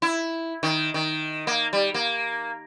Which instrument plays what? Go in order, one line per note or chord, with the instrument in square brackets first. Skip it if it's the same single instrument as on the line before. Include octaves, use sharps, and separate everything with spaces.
[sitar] E4
D#3
D#3
A#3
G3
A#3